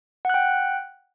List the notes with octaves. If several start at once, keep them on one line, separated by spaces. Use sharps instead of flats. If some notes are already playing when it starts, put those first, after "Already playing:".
F#5 G5 F#6